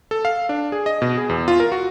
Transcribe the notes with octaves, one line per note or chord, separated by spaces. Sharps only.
A4
F5
D4
G#4
D#5
B2
G#4
E2
F4
A#4
F#4